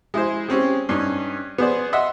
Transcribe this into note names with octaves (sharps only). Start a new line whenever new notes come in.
G#3 E4 G#4 C5
G#3 C4 C#4 G4
G2 C#4 D#4
B3 G#4 C5 D5
D#5 E5 F#5 C6